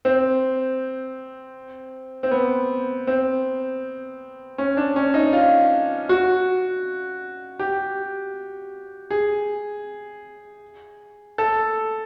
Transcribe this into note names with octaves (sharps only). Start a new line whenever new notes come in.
C4
C4
B3
C4
C#4
D4
C#4
D#4
F4
F#4
G4
G#4
A4